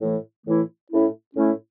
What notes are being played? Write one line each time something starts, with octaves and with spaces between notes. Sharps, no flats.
A2 E3 A3 E4
A2 E3 A3 E4
A2 A3 C#4 E4
A2 A3 C#4 E4